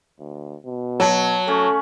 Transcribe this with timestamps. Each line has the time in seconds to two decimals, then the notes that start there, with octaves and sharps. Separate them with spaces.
0.19 D2
0.66 B2
1.00 F#3 A5
1.47 A3 C#4 A4